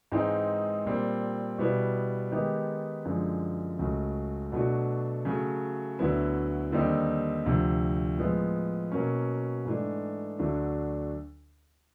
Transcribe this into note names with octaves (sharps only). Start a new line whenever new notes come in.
G#2 E3 G#3 C4 D#4
A#2 G3 C4
B2 G3 B3 E4
D#3 G#3 B3 D#4 G4
F#2 D3 F3 G#3
C#2 C#3 F#3 A3
B2 F#3 A3 D4 F#4
C#3 F#3 A3
D2 D3 F#3 B3 E4
D#2 D3 G3 C4 D#4
D2 C3 F3
A2 F3 G#3 B3
B2 F#3 A#3 C#4
G#2 E3 A3 D4
D2 D3 F#3 A3 D4